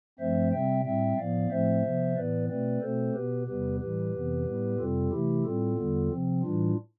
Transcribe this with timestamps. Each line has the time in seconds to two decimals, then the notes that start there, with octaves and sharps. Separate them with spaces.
0.19 G2 F3 A3 C4 C5 E5
0.52 C3 G3 C4 E5 G5
0.85 A2 G3 C4 E5 G5
1.17 A2 F3 B3 D5 F5
1.50 A2 F3 A3 C4 C5 E5
1.83 C3 F3 B3
2.16 A2 E3 B3 B4 D5
2.49 B2 A3 C4 B4 D5
2.82 B2 A3 C4 A4 C5
3.15 B2 B3 G4 B4
3.47 E2 C3 G3 B3 G4 B4
3.80 A2 E3 G3 G4 B4
4.13 F2 C3 E3 B3
4.45 A2 G3 B3
4.78 F2 C3 G3 C4 F4 A4
5.11 C3 E3 A3 E4 G4
5.44 A2 G3 C4 F4 A4
5.77 E2 D3 G3 B3
6.10 C3 F3 C4
6.42 A2 E3 G3 D4 F4